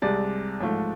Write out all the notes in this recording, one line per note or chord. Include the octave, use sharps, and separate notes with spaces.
C2 C3 G#3 D5
A1 G#2 F3 A3